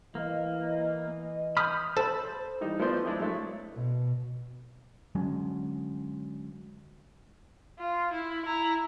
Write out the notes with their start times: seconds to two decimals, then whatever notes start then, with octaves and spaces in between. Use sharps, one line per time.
0.15 E3 A#3 D#5
1.57 B5 D#6 F6 G6 B6
1.97 A4 C5 B5
2.61 E3 G3 D#4
2.79 F3 A3 B3 E4 C5 D5
3.05 G#3 D4 E4 G#4
3.19 F#3 A3
3.75 B2
5.15 D3 F#3 G#3 C#4
7.79 F4
8.12 E4
8.45 E4 A#5